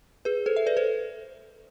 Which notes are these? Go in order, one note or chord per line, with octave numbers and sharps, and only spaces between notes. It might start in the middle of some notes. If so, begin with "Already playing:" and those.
G#4 B4
A4 C5
E5
B4 D5
A4 C5